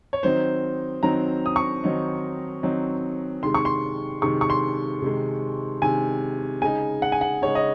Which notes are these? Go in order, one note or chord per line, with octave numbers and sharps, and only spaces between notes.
C#5
D#3 F#3 C4 D#4 C5
D#3 F#3 C4 D#4 A#5
D#6
C#6
D#3 F#3 C4 D#4
D#3 F#3 C4 D#4
C3 D#3 G#3 C6
C#6
C6
C3 D#3 G#3 C#6
C#6
C6
C3 D#3 G#3
C3 D#3 G#3 G#5
C#3 G#3 D#4 G#5
F#5
G#5
F#5
C#3 G#3 D#4 C#5
D#5